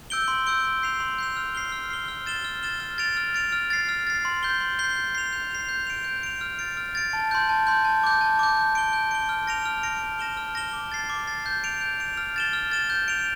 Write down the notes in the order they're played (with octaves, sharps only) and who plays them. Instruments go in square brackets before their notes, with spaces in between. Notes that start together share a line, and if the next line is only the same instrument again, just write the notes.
[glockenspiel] E6 G6 D7 G7
C6
E6 G6 D7 G7
C6
G6 C7 F7
C6
G6 C7 F7
F6
C7 G7
F6
C7 G7
F6
A6 E7 G7
F6
A6 E7 G7
F6
A6 D7 F7
F6
A6 D7 F7
F6
A6 C7
F6
A6 C7
C6
G6 C7 G7
C6
G6 C7 G7
G6
C7 F7
G6
C7 F7
G6
D7 F7
G6
D7 F7
F6
A6 D7
F6
A6 D7
A5
C6 G6
A5
C6 G6
A5
D6 G6
A5
D6 G6
G6
D7 G7
G6
D7 G7
F6
A#6 D7 F7
F6
A#6 D7 F7
F6
A#6 E7 G7
F6
A#6 E7 G7
D6
A6 C7
D6
A6 C7
G6
D7 F7
G6
D7 F7
F6
A6 E7 G7
F6
A6 E7 G7
G6
D7 F7